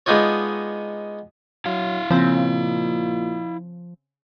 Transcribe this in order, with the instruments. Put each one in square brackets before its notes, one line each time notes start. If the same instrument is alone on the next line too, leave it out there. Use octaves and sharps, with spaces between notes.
[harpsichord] G#3 B3 D4 D#4 F4 C#5
[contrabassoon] F#3 [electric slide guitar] E4 F5
[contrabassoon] A#2 [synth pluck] C#3 C4 [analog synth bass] F3